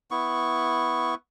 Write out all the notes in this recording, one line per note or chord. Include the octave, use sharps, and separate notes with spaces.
B3 E4 C#6